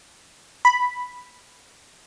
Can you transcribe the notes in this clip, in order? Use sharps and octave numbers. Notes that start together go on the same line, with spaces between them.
B5